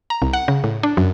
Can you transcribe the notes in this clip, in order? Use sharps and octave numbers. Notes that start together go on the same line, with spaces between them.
A#5
C2
F#5
C#3
A2
D4
F#2